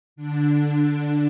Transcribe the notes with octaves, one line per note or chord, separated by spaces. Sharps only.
D3 D4